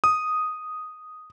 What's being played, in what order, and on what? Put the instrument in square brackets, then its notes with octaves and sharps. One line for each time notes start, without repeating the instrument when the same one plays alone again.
[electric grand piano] D#6